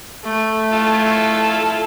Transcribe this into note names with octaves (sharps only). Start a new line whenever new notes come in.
A3
E4 F4 A4